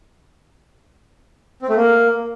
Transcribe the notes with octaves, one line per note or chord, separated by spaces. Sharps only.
C4
A3
A#3